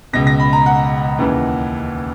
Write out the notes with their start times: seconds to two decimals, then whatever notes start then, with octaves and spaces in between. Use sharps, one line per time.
0.13 C#2 B2 A#6
0.27 A#6
0.40 B5
0.53 A#5
0.66 F#5
1.19 D#2 C#3 E3